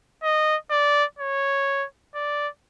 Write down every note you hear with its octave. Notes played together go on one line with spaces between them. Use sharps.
D#5
D5
C#5
D5